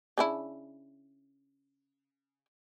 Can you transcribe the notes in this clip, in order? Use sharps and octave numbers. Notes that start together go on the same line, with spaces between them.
C#3 D4 E4